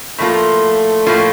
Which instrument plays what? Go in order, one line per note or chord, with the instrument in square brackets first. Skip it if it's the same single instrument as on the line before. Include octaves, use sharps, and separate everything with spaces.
[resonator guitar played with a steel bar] A2 F3 A#3 F4 [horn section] A3
[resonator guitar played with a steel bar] A2 F3 A#3 F4